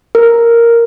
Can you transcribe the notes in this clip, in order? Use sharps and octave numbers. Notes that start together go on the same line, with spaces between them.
A#4